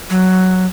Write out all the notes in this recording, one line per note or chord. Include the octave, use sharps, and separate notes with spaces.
F#3